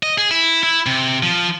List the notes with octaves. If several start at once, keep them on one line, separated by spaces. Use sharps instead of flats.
D#5
G#4
E4
E4
C3
F3